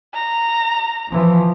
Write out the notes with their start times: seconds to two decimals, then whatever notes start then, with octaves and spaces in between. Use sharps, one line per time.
0.14 A#5
1.09 E3 F3